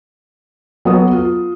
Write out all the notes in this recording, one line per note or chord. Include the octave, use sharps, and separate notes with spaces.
F#3 B3 A4 D#6
F4